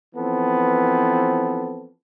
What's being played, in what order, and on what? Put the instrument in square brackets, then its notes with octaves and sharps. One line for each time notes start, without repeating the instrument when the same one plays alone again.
[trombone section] E3 F3 B3 C4 A4